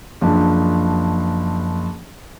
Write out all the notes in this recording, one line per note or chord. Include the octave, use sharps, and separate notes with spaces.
F#1 F3 D4